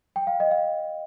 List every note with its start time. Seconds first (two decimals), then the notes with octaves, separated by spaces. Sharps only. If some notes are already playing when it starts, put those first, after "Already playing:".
0.16 G5
0.27 F5
0.40 D#5
0.51 F5